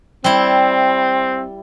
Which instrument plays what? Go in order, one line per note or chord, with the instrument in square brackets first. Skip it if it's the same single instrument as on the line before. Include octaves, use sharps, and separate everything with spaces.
[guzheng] G3 E4 [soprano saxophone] C4